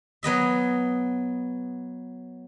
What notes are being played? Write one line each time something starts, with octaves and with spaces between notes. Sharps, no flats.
F#3 B3 D#5 E5